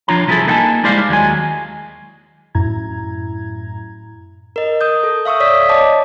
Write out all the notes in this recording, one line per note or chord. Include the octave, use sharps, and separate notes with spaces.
F3 D4 F4 C#5 A#5
C2 F3 E4 F4 G#4 A4
A#3 B3 D#4 F#5 G#5 A5
G3 G#3 E4 C5 D5 F5
D#2 F#3 G#3 G#5
F#2 A2 E4 A#5 G#6
A#4 D#5
D#6 G6
A4
E5 F5 C#6 D#6 E6
C#5 D5 D#6 B6
C#5 D#5 A5 D6